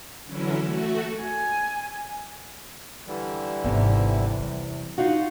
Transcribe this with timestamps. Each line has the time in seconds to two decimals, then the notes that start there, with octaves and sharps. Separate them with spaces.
0.24 D3 E3 F#3 C#4 E4
0.62 A3 F#4
1.21 G#5
3.07 D3 E3 G3
3.64 G#1 E2 C3
4.39 G3
4.98 D#4 F4 F#4 F#5